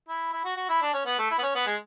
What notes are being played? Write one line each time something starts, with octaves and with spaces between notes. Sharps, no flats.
E4
E4
F#4
F#4
E4
D4
C#4
B3
A3
E4
B3
C#4
B3
G#3